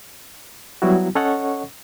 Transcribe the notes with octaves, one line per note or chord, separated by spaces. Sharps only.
F#3 G3 B3 E4 F#4
C#4 A4 C#5 D#5 F#5 C#6